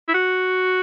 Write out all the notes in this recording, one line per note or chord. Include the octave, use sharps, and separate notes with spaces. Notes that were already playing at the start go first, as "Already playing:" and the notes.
E4
F#4